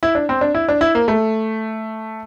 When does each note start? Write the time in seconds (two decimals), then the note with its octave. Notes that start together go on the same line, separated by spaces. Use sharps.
0.03 E4
0.15 D4
0.29 C4
0.41 D4
0.55 E4
0.69 D4
0.81 E4
0.95 A#3
1.08 A3